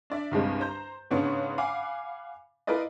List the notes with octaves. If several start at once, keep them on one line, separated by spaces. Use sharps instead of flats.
D4 D5 E5
C2 G2 G#3 C4
C5 A#5 G6
G#2 C#3 B3 D4 C#5 C#6
F5 F#5 G#5 B5 D6
E4 F4 A#4 B4 D5 D#5